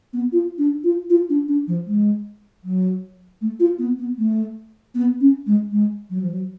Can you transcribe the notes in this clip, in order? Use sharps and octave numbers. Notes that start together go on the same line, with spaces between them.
B3
F4
D4
F4
F4
D4
D4
F3
G#3
F#3
A3
F4
B3
B3
A3
B3
C#4
G#3
G#3
F#3
F3
F#3